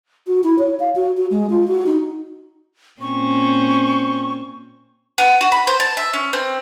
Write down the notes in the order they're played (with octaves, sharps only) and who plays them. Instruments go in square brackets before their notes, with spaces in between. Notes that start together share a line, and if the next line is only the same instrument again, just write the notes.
[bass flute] F#4
E4
C#5
F5
F#4
F#4
G#3
F4
F#4
D#4
[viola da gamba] A#2 C4 C#4 [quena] C#6
[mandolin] B3
F#4
B5
C5
A5
E5
C#4
C4